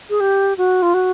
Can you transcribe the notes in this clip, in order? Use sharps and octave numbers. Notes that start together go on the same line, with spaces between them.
G#4
G4
F#4
F4
F#4